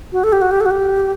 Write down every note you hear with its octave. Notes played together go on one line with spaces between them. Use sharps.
F#4
A4
G4
F#4
G4
A4
F#4
G4